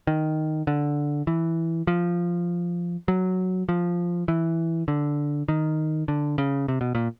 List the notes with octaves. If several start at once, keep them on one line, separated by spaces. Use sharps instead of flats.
D#3
D3
E3
F3
F#3
F3
E3
D3
D#3
D3
C#3
C3
B2
A#2